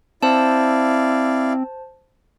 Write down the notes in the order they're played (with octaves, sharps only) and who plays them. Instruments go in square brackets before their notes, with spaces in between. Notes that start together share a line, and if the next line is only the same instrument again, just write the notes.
[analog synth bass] C4 [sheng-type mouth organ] E4 D5 F5 [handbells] C5 A5